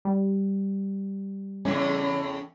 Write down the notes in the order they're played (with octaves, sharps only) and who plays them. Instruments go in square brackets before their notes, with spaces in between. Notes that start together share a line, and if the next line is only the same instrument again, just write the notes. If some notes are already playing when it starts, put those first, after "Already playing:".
[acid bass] G3
[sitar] E2 A2 C#3 [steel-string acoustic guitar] C#4